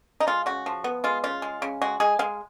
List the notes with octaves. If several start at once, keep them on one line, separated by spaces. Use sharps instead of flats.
D#4
G#3 F4
C#3 F#4
F3
B3
G#3 F4
C#3 F4
G#3
C#3
G#3 F#4
G#3 G#4
G#3 F5